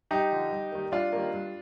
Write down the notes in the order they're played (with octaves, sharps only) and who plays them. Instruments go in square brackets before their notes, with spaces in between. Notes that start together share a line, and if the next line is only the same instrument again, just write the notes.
[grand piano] G2 D#4 G4
D3 F3
G2
D#3 G3 A#3
G2 D4 F4
D#3 G3 A#3
G2